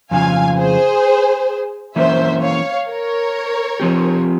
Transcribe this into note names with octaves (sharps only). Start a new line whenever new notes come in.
F2 C#3 F3 F5 G#5
G#4 C5
E3 A#3 C#4 C5 E5
C#5 F5
A#4 C#5
F3 C4 G4